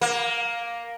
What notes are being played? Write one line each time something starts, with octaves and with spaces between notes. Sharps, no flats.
A#3